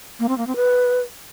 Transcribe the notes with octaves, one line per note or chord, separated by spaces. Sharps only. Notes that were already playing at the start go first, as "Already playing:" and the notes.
A#3
C4
A#3
C4
B4